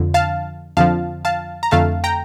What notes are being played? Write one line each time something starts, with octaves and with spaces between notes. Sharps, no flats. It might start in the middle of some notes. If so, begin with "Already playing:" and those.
Already playing: F2 D3 F3
F5 A5
F2 D3 F3 F5 A5
F5 A5
A#5
F2 D3 A3 F5 A5
G5 A#5